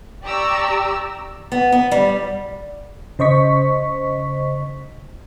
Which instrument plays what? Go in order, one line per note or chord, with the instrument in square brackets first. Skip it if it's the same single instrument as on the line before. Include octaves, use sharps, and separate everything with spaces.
[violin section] G4 D5 A#5 C#6 E6
[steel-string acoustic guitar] B3
B3
G3
[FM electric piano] C#3 C5 D#5 C#6 B6